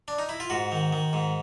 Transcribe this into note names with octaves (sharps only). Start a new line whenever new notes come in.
D4
D#4
E4
F4
G#2 F#4
D#3
D#3
G#2